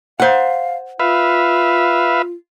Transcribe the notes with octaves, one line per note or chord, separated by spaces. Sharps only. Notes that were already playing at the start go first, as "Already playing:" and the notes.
C5 F5 F#5
F4 B4 E5 F5